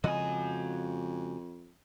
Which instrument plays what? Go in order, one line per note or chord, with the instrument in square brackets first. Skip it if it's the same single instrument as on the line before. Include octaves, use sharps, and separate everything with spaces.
[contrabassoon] F2 [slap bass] C#3 F3 G#3 [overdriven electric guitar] F#4 G#5 [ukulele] D#5